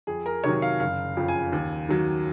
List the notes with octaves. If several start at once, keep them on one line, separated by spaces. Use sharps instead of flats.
F2 G#4
A#4
C3 D#3 F#3 C#5
F5
F#1 F5
F2 C#3 F3
G#5
D#2
D#3 F#3